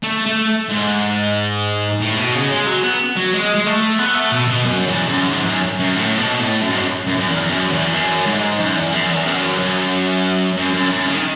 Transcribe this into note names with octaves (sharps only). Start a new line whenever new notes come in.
A3
A3
G#2
A2
B2
C#3
G#3
F#3
B3
F#3
G#3
G#3
A3
B3
A3
B2
B2
F#2
E2
F#2
G#2
F#2
F#2
A2
B2
A2
F#2
G#2
F#2
F#2
F#2
E2
F#2
E2
F#2
G#2
F#2
E2
F#2
E2
F#2
F#2
F#2
F#2
F#2
C#3
D#3